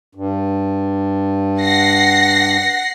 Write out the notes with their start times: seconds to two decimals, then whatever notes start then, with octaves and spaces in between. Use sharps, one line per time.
0.15 G2
1.60 F#5 A#6 C7